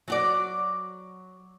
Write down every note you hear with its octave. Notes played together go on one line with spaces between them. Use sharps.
F#3 F#4 D5